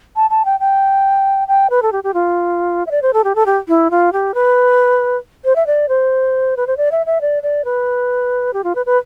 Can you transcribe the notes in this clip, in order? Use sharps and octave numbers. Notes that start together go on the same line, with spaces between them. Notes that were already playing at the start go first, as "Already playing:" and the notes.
A5
A5
G5
G5
G5
B4
A4
G4
G4
F4
E5
D5
C5
A4
G4
A4
G4
E4
F4
G4
B4
C5
E5
D5
C5
B4
C5
D5
E5
E5
D5
D5
B4
G4
F4
B4
B4